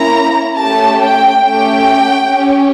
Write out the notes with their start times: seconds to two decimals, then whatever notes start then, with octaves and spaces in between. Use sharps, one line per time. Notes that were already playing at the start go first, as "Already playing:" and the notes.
Already playing: A#3 C#4 E4 A#5
0.58 A3 C#4 G4 A5
1.00 G5
1.42 A3 C#4 G4 G5
2.26 C#4 G4